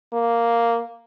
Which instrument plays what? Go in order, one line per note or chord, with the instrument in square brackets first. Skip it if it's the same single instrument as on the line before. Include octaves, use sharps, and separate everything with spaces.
[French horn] A#3